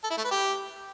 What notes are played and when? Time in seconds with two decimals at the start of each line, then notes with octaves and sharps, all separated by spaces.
0.04 A4
0.11 E4
0.18 A3
0.24 B4
0.31 G4